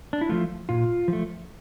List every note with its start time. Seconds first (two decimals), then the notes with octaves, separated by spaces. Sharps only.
0.13 D4
0.21 E4
0.29 F3 A3 F4
0.69 A#2 F4
1.08 F3 A3